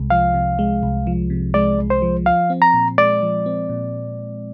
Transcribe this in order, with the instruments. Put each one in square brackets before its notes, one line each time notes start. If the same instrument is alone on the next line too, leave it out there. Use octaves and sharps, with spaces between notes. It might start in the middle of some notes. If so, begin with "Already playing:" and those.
Already playing: [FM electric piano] C2 C3 G#3
[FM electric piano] F3 [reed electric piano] F5
[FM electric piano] C3
G#3
C2
F3
C3
[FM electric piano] G#3 [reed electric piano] D5
[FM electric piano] C2
[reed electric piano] C5
[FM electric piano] F3
[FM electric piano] F3 [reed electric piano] F5
[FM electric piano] C4
[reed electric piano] A#5
[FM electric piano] A#2
[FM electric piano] G#3 [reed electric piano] D5
[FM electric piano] F3
C4
A#2